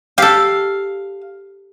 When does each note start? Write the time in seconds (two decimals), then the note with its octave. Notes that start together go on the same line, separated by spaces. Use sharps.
0.18 G4 A4 F5